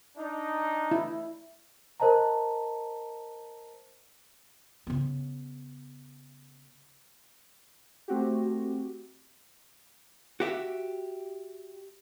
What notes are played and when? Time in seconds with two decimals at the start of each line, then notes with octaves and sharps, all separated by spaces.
0.16 D4 D#4
0.91 E4
2.00 A#4 C5 D#5 A5 A#5
4.87 C#3 B3
8.08 A3 C4 F#4 G4
10.40 F#4 G4 E5